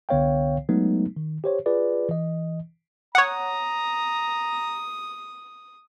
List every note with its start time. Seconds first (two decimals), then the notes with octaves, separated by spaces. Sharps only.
0.09 C2 D3 B3 C#5 F5 G5
0.69 F#3 G#3 A3 B3 D#4
1.17 D#3
1.44 G4 C5 C#5
1.66 F4 G#4 B4 D5
2.09 E3 D#5
3.15 C#5 F#5 A#5 D#6